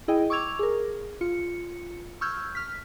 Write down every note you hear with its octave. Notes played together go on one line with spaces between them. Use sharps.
E4 G#4 D#5 G5
C#6 D6 E6 G#6 F7
G#4 A#4
F4 C#7
C#6 E6 F6 G6 G#6
F6 B6